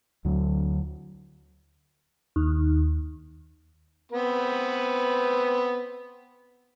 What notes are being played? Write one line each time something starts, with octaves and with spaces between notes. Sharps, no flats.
D2 D3 F#3
D#2
B3 C4 B4